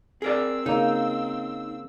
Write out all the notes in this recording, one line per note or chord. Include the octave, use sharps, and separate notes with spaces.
C4 G#4 A#4 D5 E6
C#3 A#3 D#4